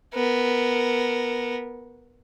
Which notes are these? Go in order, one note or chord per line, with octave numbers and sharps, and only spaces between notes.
B3 A#4